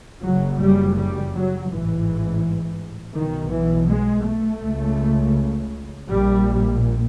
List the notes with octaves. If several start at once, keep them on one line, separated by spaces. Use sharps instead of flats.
F#1 F#2 C#3 F#3
G3
G3
F#3
A1 G#2 E3
B1 B2 D#3
E3
G#3
A3
C#2 C#3
A#1 A#2 G3